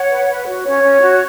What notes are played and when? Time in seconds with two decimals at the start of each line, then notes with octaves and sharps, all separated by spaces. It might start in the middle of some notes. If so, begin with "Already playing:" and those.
Already playing: C#5 F#5
0.10 B4
0.29 B4
0.47 F#4
0.65 C#4 C#5
0.83 C#4
1.01 F#4